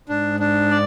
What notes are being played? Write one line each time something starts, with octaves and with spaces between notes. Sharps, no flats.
G#2 D4
D4
D5